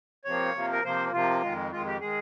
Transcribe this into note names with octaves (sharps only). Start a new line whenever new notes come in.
C3 F3 A#3 C#5
C3 F3 A#3
A#4
C3 F3 A#3 C5
C3 F3 A#3 F4
F2 D#3 G#3
F2 D#3 G#3 F4
G4
D#3 G#3 G#4